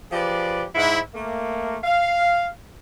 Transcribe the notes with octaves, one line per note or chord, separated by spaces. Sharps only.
F3 G4 G#4 B4 D5
G#2 E4
A3 A#3
F5